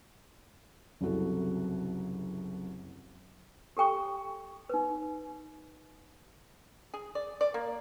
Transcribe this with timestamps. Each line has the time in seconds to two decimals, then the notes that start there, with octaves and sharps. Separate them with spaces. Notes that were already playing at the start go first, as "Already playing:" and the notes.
1.01 F#1 C2 F#4 A4
3.77 G4 A4 G5 C#6
4.70 D#4 B4
6.94 G#4
7.15 D5
7.41 D5
7.54 A#3